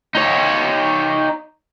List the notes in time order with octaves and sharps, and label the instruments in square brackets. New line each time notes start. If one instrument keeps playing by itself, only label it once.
[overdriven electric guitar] D#4 C#5